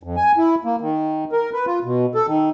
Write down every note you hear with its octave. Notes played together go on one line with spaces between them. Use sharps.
F2
G#5
E4
A#3
D#3
A#4
B4
F4
B2
A4
D#3